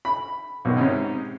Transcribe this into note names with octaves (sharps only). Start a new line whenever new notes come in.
B5
B1 B2 D#3
G#2 C3 C#4 D#4